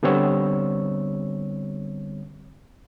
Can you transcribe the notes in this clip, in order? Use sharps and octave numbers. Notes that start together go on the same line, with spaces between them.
D3 G3 B3 C4 C#5 E6